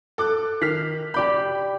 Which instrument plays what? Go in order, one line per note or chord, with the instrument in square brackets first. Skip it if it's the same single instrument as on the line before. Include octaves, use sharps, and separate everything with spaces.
[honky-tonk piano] A4 D6 F#6
[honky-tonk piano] D#3 [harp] F6 B6 C7
[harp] G4 D5 G6 [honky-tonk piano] B5